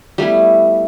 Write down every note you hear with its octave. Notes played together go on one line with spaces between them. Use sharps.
G3 A3 B3 E4